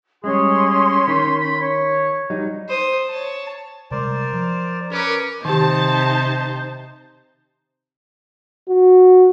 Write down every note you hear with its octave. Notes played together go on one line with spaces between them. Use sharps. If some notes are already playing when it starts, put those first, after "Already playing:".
G3 G#3 C#4 G#4 C6
D#3 B5
B5
C#5
F#3 G3 D#4
C5 D#6
C#5 A5
C3 G3 G#3 A#4 C5 D5
F3
C#4 A#4 B4 D6
C3 D#3 D#4 G4 C5 A5
F#4